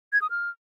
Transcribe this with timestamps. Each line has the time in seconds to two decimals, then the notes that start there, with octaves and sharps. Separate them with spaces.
0.13 G#6
0.22 D#6
0.30 F6